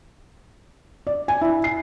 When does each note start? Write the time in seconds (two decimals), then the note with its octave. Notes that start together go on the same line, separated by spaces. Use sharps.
1.07 D5
1.28 G#5
1.41 E4
1.64 C7